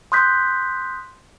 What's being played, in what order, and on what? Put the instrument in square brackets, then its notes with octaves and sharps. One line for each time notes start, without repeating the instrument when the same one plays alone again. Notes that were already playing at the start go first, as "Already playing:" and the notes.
[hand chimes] C6 D#6 F#6 G6 B6